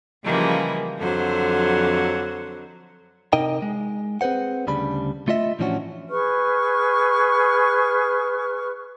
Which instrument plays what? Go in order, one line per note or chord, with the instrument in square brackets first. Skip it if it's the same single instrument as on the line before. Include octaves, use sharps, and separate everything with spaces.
[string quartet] C#3 E3 F3 G3 G#3 A#3
F2 D3 F#3 C5
[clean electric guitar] C3 D#4 A#4 D#5 G5
G#3
C4 G#4 B4 C5 F#5
D2 C#3 G3 D4 B5
A3 F4 D#5 E5
A2 E3 F3 C#4 D4 F#4
[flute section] G#4 B4 C#6 F6